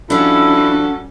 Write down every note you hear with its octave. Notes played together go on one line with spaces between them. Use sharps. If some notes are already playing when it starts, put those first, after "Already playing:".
F3 G3 C#4 D4 E4 F#4 A4